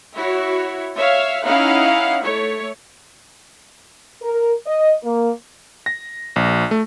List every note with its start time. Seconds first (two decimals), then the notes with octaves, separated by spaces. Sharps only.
0.15 E4 F#4 C#5
0.95 C#5 E5 F5
1.44 C#4 D#4 E4 F5 F#5
2.22 A3 C#5
4.22 A#4
4.66 D#5
5.04 A#3
5.86 A#6
6.36 A#1
6.71 A3